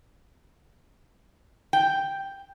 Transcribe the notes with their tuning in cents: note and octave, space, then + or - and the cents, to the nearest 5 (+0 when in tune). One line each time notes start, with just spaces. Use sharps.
G5 +0